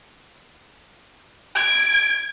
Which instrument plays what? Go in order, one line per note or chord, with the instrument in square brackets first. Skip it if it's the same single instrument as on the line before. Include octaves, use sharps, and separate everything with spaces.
[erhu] G#6 [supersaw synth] D7